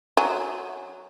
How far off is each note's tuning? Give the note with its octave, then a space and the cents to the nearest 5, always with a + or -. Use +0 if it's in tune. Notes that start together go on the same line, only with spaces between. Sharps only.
F#3 -5 G#5 +0